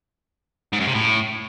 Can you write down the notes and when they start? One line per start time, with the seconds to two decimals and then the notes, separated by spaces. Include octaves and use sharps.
0.73 G#2
0.80 F#2
0.87 C3
0.94 A2